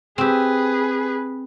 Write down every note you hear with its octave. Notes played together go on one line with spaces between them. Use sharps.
C4 G4 G#4 B4